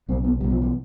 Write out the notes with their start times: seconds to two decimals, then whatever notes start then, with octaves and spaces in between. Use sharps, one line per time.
0.09 B1 C4
0.12 B2
0.24 B3
0.40 B1 B2 G3
0.51 F3
0.62 E3